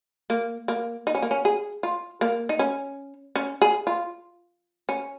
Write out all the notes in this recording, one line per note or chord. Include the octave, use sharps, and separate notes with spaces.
A#3
A#3
D#4
C#4
A#3
C#4
G#4
F4
A#3
D#4
C#4
C#4
G#4
F4
C#4